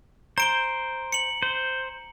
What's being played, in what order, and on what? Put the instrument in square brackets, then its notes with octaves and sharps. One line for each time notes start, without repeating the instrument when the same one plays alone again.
[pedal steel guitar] C5 [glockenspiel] A#5 D7 G7
[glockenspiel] C#7 F#7
[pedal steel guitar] C5